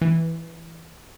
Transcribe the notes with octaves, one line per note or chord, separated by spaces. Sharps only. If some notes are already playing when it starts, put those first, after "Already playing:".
E3